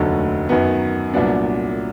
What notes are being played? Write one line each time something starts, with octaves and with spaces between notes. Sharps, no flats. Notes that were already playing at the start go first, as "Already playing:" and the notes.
Already playing: F1 D#2 D3 F#3 A3
F#2 D#3 F#3 B3
C2 A#2 F#3 B3 D4